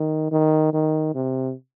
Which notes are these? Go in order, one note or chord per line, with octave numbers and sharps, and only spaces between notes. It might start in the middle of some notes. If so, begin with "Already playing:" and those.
Already playing: D#3
D#3
D#3
C3